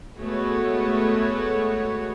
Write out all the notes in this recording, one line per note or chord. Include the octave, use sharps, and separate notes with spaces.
G#3 A3 B3 F#4 C#5